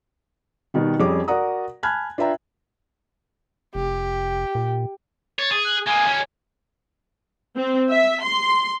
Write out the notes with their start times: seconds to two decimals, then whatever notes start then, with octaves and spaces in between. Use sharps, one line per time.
0.74 B2 D#3 G3
1.00 F2 G3 C#4 G#4 D6
1.28 F#4 A#4 D5 F#5 A#5 D#6
1.83 G#5 A5 B5 F6 F#6 G#6
2.18 D4 F4 B4 E5 G5 A#5
3.75 F1 G4
4.55 A#2
5.39 C#5 A6
5.51 G#4
5.65 F#6
5.87 G#3 A#3 G#5
6.06 D2 C#4
7.56 C4
7.90 E5
8.22 C6